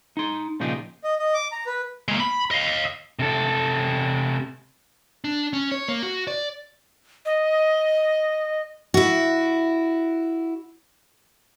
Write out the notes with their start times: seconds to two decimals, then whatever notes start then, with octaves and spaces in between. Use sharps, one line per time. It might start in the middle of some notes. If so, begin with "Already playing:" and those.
0.17 D#4 C6
0.60 A#2 C#3 F3 D#4 G4 G#4
1.04 D#5
1.19 D#5
1.34 D6
1.52 A#5
1.67 B4
2.08 G#3 A#3
2.20 B5
2.51 D#5 F5
3.19 C3 A4
5.24 D4
5.53 C#4
5.71 C#5
5.88 A#3
6.03 F#4
6.27 D5
7.26 D#5
8.94 E4 F#4